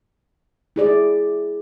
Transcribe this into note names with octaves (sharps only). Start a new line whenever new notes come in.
E4 G#4 D5